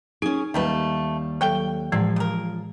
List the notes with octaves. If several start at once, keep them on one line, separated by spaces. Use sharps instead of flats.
C#4 D#4 G#4
D#2 D#3 G3 A3 B4 F5
F#3 A4 C#5 G5
A2 E3 F3 G#3 C4
C#3 A#4